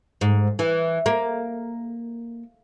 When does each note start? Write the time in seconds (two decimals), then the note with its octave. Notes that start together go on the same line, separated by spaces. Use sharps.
0.21 G#2
0.59 E3
1.06 A#3